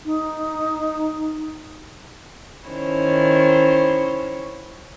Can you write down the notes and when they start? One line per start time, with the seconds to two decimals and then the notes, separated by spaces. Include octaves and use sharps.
0.05 D#4
2.68 D#3 C#4 E4 C5 C#5